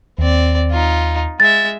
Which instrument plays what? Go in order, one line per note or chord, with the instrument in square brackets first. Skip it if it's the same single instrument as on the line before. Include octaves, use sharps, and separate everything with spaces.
[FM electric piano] D#2 [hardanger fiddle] C4 D5
[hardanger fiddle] D#4 F4
[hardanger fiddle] G#3 E5 [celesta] A6